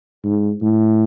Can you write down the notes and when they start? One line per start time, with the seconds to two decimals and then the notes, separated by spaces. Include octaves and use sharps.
0.25 G#2
0.62 A2